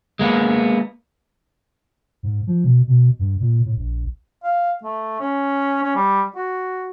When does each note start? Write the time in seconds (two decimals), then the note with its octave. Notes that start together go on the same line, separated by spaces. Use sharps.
0.19 G#3 A#3 B3
2.23 G#2
2.47 F3
2.64 B2
2.88 B2
3.19 G2
3.40 A#2
3.65 A2
3.76 A#1
4.43 F5
4.83 A3
5.20 C#4
5.83 C#4
5.96 G3
6.36 F#4